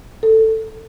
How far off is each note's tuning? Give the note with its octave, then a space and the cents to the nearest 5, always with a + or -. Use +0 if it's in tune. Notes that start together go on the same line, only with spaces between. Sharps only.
A4 +10